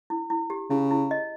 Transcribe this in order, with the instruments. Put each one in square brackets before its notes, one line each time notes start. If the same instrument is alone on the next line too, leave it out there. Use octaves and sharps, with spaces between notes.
[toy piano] E4
E4
G4
[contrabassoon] C#3 [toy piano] E4
[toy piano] E4
D#5